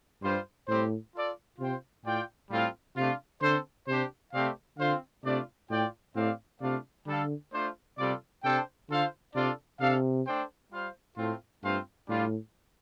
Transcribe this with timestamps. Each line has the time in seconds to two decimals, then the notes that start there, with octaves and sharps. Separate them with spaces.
0.23 G2 G3 F4 C5
0.68 A2 G3 C4 G4 C5
1.15 F4 A4 D5
1.59 C3 F4 C5 G5
2.05 A2 F4 D5 G5
2.50 A2 G3 C4 F4 A4 F5
2.96 C3 A3 D4 F4
3.42 D3 C4 A4 C5
3.87 C3 D4 G4 C5
4.34 C3 A3 C4 G4 D5 F5
4.79 D3 C4 F4 C5 F5
5.24 C3 A3 D4 F4 D5
5.70 A2 F4 D5 G5
6.16 A2 C4 G4 D5 F5
6.61 C3 A3 D4 F4 D5 F5
7.07 D3 G3 D4 A4 F5
7.53 A3 D4 F4 C5
7.99 C3 G3 F4 A4 D5
8.44 C3 D4 A4 C5 G5
8.89 D3 F4 A4 C5 F5
9.35 C3 D4 F4 A4 D5
9.80 C3 D4 A4 F5
10.26 A3 D4 A4 C5 G5
10.72 G3 F4 C5 F5
11.18 A2 A3 C4 F4
11.63 G2 A3 C4 F4 C5 F5
12.09 A2 G3 D4 F4